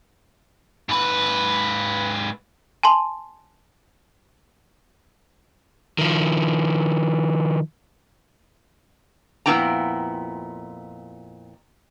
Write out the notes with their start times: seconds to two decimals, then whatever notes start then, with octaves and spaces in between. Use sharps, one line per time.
0.89 G#2 B4
2.83 G#5 A5 C6
5.98 D#3 F3
9.46 F2 A#2 B3 E4 G5 A#5